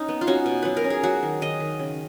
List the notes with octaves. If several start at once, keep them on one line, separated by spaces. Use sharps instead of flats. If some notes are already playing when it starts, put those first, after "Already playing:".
Already playing: C#4 D#4
B3
F4
C#4 F#4
B2
F#3 B4
A#4
C#4
G#4
F#3 F#4
D#3
D#3 D#5
D#3
C#3